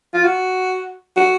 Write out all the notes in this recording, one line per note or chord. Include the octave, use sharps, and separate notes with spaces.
F4
F#4
F#4